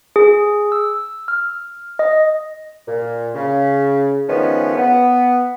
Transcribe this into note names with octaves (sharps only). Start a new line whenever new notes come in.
G#4
E6
F6
D#5
A#2
C#3
D#3 F3 G#3 A3 B3 C#4
B3